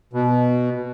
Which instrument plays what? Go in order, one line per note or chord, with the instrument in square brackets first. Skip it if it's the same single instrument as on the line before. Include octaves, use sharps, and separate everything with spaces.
[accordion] B2